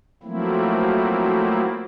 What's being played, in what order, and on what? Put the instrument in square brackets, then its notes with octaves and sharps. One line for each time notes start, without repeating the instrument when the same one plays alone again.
[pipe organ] F3 F#3 A3 A#3 C4 E4